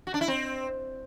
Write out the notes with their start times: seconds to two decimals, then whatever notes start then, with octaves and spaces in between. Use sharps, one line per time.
0.07 F#4
0.14 D4
0.21 E4
0.28 C4